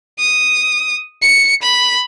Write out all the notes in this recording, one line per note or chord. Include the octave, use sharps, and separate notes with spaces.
D#6
C#7
B5